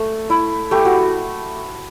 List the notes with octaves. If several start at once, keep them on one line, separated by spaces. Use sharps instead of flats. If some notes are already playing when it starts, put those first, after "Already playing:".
Already playing: A3
E4
A3 G4
F#4